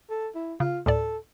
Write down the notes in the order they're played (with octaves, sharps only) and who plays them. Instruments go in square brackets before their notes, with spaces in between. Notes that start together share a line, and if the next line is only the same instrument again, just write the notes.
[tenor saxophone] A4
E4
[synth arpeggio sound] C#3 [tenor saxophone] F4
[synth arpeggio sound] D2 A2 D5 [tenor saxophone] A4